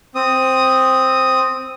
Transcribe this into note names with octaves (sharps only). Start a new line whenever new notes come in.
C4 D#6